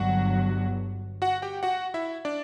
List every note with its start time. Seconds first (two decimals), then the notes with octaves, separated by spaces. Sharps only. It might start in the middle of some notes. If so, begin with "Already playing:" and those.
Already playing: G1 G2 F#3 F#4 F#5
1.22 F#4 F#5
1.42 G4 G5
1.63 F#4 F#5
1.94 E4 E5
2.25 D4 D5